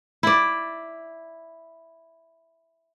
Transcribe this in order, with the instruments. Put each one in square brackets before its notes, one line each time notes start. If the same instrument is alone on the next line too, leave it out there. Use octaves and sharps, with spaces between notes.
[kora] E4 D5